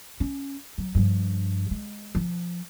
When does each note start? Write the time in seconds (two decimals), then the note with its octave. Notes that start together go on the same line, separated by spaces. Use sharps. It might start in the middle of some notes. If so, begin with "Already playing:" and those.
0.20 C#4
0.78 F#3
0.95 G2 F3
1.71 G#3
2.15 F3